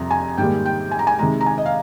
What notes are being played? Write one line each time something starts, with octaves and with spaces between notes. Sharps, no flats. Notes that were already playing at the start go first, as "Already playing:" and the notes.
Already playing: F2 C3 G3 A#5
G#5
G#2 D#3 G3 A#3 G5
G5
G#5
A#5
G#5
C3 D#3 G#3 A#5
A#5
G#5
D#5
F5